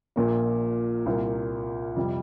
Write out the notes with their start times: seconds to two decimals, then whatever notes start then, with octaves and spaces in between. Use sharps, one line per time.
0.16 A#1 A#2 A#3
1.06 C2 A#2 A#3
1.96 F2 C3 G3